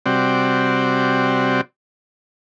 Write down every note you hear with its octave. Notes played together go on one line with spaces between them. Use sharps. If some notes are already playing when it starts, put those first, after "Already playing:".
C3 G3 C4 F#4 D5